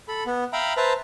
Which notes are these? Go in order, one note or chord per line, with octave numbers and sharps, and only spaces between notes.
A4 B5
B3
E5 F5 G5 A#5 B5
B4 C5 E5 A5 A#5